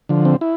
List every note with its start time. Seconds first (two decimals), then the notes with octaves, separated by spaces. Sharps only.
0.09 D3 F3
0.25 C4
0.41 E4